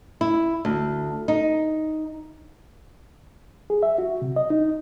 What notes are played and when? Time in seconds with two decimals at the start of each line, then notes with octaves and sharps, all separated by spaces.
0.21 E4
0.65 D2
1.28 D#4
3.70 G#4
3.83 E5
3.98 F#4
4.22 C3
4.36 D#5
4.50 D#4